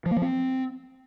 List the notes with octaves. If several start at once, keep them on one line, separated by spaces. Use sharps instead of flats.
F3
A#3
F3
C4